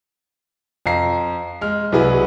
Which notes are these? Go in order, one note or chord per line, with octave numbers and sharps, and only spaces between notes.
F2 F5 A#5 C7
G#3 F6
C2 F#3 E4 G#4 B4